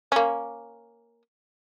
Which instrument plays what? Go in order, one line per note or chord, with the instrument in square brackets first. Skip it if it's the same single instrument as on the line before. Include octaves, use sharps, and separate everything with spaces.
[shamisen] A#3 C#4